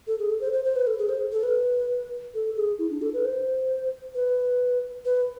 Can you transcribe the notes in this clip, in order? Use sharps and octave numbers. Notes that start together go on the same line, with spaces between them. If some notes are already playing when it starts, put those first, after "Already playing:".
A4
G#4
A4
C5
C5
C5
B4
A4
G#4
C5
A4
B4
A4
G#4
E4
D4
A4
B4
C5
B4
B4